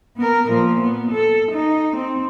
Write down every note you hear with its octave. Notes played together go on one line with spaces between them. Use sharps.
B3 A#4
A#2 F3
B3
A4
D#4
C4